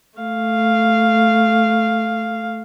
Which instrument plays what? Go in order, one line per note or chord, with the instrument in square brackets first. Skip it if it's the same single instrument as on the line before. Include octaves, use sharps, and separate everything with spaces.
[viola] A3 F5